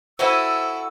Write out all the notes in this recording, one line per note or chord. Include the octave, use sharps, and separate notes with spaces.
E4 F#4 A4 C5 E5 G#5 E6